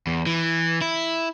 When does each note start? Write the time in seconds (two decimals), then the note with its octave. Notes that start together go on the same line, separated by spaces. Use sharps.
0.07 E2
0.26 E3
0.81 E4